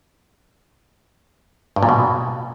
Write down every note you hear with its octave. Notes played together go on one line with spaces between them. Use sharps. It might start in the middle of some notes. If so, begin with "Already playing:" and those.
G2
A#2
B2